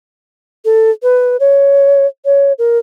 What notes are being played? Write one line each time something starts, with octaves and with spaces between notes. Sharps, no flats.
A4
B4
C#5
C#5
A#4